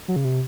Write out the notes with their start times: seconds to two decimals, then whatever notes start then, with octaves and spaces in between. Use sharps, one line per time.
0.08 F#3
0.16 C#3
0.24 C3